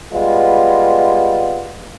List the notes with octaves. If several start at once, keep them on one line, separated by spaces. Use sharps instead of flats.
G3 G#3 B3 F4